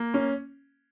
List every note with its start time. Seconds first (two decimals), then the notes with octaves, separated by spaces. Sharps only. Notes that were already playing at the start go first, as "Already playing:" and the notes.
Already playing: A#3
0.14 C#4